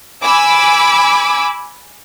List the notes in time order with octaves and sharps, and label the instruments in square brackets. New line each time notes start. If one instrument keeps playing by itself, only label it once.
[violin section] G#5 B5 D6 E6